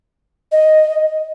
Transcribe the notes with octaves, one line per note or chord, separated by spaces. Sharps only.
D#5